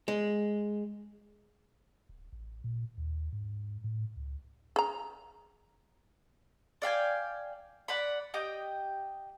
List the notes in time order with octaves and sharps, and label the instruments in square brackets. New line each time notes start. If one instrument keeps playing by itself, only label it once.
[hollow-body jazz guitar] G#3
[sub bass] D1
A1
A#2
D#2
G#2
A2
C#2
[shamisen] G#4 A#5
[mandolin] D5 F5 G5 G#5
D5 F#5 B5
G4 D#5 G5 D#6